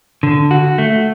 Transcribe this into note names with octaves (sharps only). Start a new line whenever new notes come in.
D3
F#4
A3